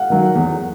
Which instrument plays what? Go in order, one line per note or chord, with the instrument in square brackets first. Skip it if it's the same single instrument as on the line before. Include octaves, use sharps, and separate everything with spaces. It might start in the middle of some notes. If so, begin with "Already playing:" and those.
Already playing: [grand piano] F5 F#5
[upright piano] D#3 F#3
E2